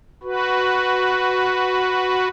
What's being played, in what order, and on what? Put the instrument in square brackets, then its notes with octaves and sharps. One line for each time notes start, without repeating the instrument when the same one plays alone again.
[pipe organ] F#4 B4